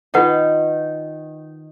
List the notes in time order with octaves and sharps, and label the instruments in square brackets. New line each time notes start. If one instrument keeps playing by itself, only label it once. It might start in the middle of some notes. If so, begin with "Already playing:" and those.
[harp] D#3 D#4 [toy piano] F4 B4 F#5